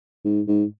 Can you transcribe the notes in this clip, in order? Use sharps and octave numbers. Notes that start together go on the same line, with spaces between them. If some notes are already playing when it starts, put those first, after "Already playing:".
G#2
G#2